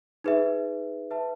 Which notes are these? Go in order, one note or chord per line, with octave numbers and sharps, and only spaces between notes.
D#4 G#4 B4 E5
B4 E5 A5